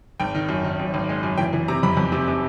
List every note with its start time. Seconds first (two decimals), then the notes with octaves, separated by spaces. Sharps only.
0.20 G#1 G5
0.35 D#3
0.49 F#2
0.64 D#3
0.79 F#2
0.94 G#1
1.09 G#3
1.23 F#2
1.37 E3 G5
1.53 E3
1.68 C3 A#5
1.83 F2 B5
1.97 F2
2.12 C3
2.28 C3